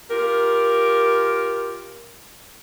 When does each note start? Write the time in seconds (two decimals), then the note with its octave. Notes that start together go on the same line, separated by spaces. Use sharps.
0.10 F4 G4 A#4